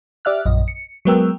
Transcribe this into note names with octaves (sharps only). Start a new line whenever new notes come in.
G4 D5 E5 F6 F#6
A#1 F#2 D#5
C#7
F#3 G#3 B3 A#4 G5 E6